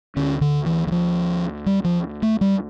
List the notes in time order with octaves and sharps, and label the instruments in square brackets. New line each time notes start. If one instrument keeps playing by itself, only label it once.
[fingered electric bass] D2 D3 C#4
D3
E3
E3
F3
G3
F3
A3
G3